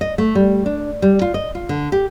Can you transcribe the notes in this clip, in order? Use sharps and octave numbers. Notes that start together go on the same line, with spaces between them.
D#5
A3
G3
D4
G3
F4
D#5
F4
D3
G4